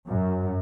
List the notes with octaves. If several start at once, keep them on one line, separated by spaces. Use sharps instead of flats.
F#2